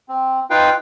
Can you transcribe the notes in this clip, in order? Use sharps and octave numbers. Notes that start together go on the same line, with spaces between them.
C4
D#4 F4 B4 F5 G5